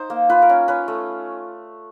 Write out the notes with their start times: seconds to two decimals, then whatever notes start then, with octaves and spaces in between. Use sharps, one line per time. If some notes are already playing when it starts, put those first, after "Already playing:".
Already playing: D#4 C5
0.10 A#3
0.30 F4 B4
0.42 A#4
0.49 C#4
0.68 C#4 B4
0.88 A3